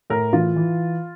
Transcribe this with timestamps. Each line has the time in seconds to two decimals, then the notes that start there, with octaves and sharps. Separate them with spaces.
0.10 A2 A#4
0.33 E3 F4
0.56 E3